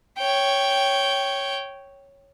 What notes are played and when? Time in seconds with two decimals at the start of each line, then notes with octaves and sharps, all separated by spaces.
0.18 C#5 G5